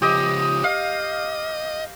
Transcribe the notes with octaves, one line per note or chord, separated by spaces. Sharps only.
C#3 F3 G4 D#5
D#5 F5